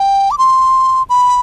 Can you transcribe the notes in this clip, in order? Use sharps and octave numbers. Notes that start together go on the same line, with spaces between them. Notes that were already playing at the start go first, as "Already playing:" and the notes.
Already playing: G5
D6
C6
B5